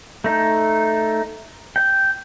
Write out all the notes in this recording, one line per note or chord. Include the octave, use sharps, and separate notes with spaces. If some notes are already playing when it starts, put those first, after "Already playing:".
A3 D#4
G5